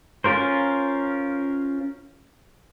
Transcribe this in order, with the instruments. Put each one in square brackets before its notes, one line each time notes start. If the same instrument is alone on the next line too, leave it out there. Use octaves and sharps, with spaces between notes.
[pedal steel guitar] C#4 F4 A#4 C5